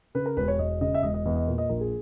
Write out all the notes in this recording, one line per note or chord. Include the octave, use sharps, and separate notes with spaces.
C#3 B4
A#4
E1 B4
C#5
E1 D#5
C#3 D#5
E5
E1 D#5
D#5
E2 D#5
D#5
A#2
D#5
A#1 A#4
G#4